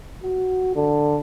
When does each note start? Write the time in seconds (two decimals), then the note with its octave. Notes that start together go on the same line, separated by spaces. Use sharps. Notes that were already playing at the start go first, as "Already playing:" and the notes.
0.23 F#4
0.76 D3